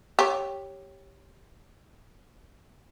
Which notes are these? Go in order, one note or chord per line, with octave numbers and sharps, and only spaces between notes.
G4 C#5